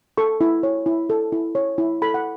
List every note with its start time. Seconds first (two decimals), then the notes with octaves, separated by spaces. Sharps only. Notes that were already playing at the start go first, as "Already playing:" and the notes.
0.17 A4 C#6
0.41 E4
0.63 C#5
0.86 E4
1.10 A4
1.33 E4
1.55 C#5
1.78 E4
2.02 A4 B5
2.14 F#5